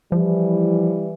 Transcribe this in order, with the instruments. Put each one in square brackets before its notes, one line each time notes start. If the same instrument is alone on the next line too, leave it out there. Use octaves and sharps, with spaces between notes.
[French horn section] E3 G3 [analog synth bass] F3